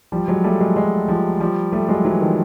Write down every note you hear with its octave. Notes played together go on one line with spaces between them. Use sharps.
F3 G3
F#3 G#3
G3 A3
F#3 G#3
F#3 G#3
F3 G3
F3 G3
G3 A3
F#3 G#3
E3 F#3
D#3 F3